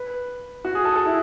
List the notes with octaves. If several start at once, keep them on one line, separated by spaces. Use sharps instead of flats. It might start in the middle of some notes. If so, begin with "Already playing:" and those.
Already playing: B4
F#4
G#4
A4
A4
E4